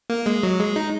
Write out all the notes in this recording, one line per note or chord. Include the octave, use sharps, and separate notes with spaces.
A#3
G#3
F#3
G#3
D#4